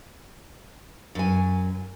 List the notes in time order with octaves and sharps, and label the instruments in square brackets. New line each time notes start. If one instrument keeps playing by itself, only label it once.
[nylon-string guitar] F#2 G#5